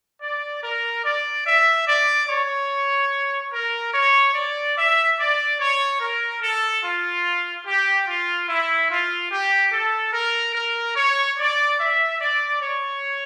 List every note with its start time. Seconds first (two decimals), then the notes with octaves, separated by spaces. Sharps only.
0.22 D5
0.63 A#4
1.05 D5
1.46 E5
1.87 D5
2.29 C#5
3.52 A#4
3.94 C#5
4.35 D5
4.76 E5
5.18 D5
5.59 C#5
6.00 A#4
6.41 A4
6.83 F4
7.65 G4
8.06 F4
8.48 E4
8.89 F4
9.30 G4
9.72 A4
10.13 A#4
10.55 A#4
10.96 C#5
11.38 D5
11.79 E5
12.20 D5
12.61 C#5